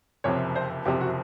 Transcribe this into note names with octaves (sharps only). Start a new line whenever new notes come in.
F#1 F2 C3 C#5
C5
F#1 F2 C3 G4
F#4